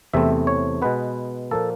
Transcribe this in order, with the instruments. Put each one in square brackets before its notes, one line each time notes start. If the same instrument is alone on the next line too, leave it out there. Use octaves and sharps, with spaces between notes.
[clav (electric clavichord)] E2 C3 E3 A3 C4 E5
C#5
B2 G#3 B3 B4
A#2 F3 A#3 A4